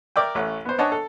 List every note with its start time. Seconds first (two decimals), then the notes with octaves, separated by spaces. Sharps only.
0.16 A#4 D5 E5 G5
0.35 A1 A3 C#5 F#5
0.65 B3 C5
0.78 D4 C#5 D#5 F#5 G#5 A5
0.92 A4